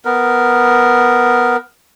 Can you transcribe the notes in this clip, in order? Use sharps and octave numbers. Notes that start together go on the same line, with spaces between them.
B3 A#4